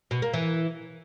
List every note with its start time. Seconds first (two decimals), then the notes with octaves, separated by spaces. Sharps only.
0.11 B2
0.22 A#3
0.33 E3